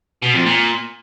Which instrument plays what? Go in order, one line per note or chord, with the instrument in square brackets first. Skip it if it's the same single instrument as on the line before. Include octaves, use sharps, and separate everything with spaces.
[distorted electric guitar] B2
F2
A#2